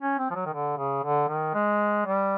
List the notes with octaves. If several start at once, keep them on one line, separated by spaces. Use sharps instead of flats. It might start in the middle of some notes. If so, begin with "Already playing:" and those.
C#4
C4
F3
F#3
D#3
D3
C#3
D3
D#3
G#3
G3